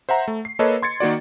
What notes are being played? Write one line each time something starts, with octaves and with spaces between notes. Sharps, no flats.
C5 E5 F#5 A#5
A3
C7
A#3 A4 B4 C#5 D#5
C6 G#6 A6 C#7
D#3 A#3 F#4 D5